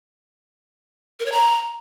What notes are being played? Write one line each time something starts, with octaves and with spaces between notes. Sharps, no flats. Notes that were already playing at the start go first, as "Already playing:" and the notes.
A#4
C#5
A#5